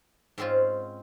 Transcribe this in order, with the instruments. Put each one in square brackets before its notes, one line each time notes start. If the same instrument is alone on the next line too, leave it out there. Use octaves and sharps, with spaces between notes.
[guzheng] G#2 G#3 C4 C#4 F4